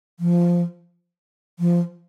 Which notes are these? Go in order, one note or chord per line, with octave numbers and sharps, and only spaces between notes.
F3
F3